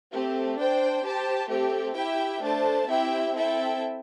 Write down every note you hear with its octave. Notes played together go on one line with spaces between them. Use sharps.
A3 C4 G4
D4 C5 G5
G4 C5 A5
A3 C4 G4
E4 G4 E5 G5
A3 D4 C5 A5
C4 E4 G4 E5 G5
C4 E4 A4 E5 G5